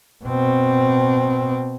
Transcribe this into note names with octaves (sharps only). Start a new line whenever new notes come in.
B2 C4